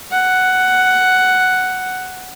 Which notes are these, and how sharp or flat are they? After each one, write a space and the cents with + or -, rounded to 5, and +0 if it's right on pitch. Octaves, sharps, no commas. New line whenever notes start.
F#5 +5